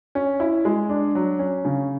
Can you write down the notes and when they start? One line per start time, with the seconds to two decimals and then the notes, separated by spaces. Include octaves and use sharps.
0.15 C#4
0.40 E4
0.65 G#3
0.89 D4
1.15 F#3
1.39 C#4
1.65 C#3